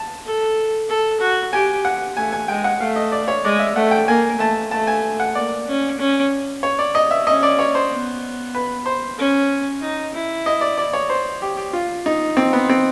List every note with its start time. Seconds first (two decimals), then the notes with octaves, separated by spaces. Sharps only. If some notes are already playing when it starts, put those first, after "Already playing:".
Already playing: A5
0.25 A4
0.89 A4
1.20 F#4
1.53 G4 G#5
1.85 F#5
2.17 A3 G#5
2.32 G#5
2.48 G#3 G5
2.64 F#5
2.80 A3 F5
2.96 D#5
3.12 D5
3.28 C#5
3.44 G#3 D5
3.59 E5
3.75 A3 F#5
3.91 G5
4.07 A#3 G#5
4.39 A3 A5
4.71 A3 A5
4.87 G#5
5.20 F#5
5.35 A#3 D5
5.67 C#4
5.99 C#4
6.63 C#5
6.79 D5
6.95 D#5
7.11 E5
7.27 C#4 D#5
7.43 D5
7.59 C#5
7.75 C5
7.91 B3
8.55 B4
8.86 C5
9.18 C#4
9.82 D#4
10.14 E4
10.46 D#5
10.61 D5
10.78 D5
10.93 C#5
11.10 C5
11.42 G4
11.57 G4
11.73 F4
12.06 D#4
12.37 C4
12.53 B3
12.70 C4